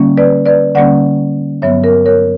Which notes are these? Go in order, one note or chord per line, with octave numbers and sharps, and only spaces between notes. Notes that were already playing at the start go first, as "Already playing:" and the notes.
Already playing: D3 G3 A#3 C#4
B4 D5
B4 D5
D3 G3 A#3 C#4 D5 F#5
G2 F#3 B3 C#5 E5
A#4
A#4 C#5